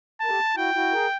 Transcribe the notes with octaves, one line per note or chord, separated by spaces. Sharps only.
A#4 A5
G4 A4
E4 F#4 G5
E4 F#4
G#4 A#4